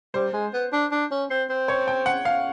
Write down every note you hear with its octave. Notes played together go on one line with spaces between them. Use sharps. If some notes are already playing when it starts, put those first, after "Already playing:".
G3 C5
G#3
B3
D4
D4
C#4
C4
C4
C#5
G5
F#5
F5